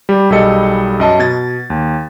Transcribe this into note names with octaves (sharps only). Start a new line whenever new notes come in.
G3
B1 G3 G#4 A4 D#5 C#7
F#2 D#5 A5
B2 G#6 A6
D#2